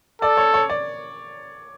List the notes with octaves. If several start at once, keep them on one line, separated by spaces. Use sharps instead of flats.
A4 D5
C#5
C#5
D5